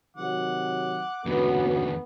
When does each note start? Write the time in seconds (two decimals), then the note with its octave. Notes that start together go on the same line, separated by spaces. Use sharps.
0.16 C3 D#3 F#3 F#5 D6
1.26 E2 D3 A3 B3 C#4 F#4